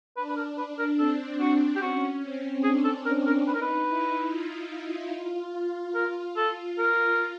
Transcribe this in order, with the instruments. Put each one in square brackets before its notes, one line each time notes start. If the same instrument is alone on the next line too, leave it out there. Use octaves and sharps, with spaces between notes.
[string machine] D4 [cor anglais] B4
[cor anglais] B4
A#4
B4
A#4
[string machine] C4 [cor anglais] A4
[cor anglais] F#4
G4
[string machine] C#4 [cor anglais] F#4
[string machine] C4
[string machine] D4 [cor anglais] G#4
[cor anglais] A4
A#4
A#4
[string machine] D#4 [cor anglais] B4
[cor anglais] A#4
B4
[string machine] E4
F4
[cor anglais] A#4
A4
[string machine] F4 [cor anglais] A#4